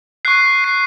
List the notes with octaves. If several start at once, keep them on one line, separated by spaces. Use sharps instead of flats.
C#6 F#6 C7
C7